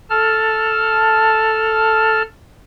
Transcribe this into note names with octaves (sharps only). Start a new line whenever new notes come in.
A4 A5 F6